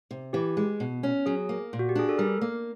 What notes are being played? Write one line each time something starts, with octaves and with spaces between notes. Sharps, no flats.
C3
E3 G4
G#3
B2
C#4
F#3 G#4
A#3
A#2
F#4
G4
D4 G#4
A4
G3 A#4
A#3